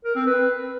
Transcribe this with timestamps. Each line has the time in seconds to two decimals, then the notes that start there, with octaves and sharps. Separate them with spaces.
0.05 A#4
0.16 C4
0.26 B4